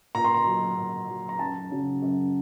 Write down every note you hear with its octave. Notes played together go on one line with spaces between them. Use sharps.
A#2 A#5
C6
A#5
F#3
A#2
F#3
A#5
F#2 A5
C#3 F#3
F#2